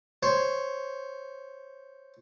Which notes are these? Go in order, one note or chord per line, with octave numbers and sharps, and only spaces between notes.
C5 C#5